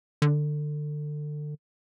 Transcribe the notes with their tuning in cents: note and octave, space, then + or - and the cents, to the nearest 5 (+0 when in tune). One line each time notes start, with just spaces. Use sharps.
D3 +25